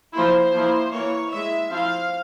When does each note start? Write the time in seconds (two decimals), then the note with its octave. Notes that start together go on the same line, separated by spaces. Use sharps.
0.14 F3 A#3 E4 C5
0.53 F3 A#3 E4
0.92 E3 A#3 E4 C#5
1.31 G#3 E4 E5
1.70 F3 C4 E4 F5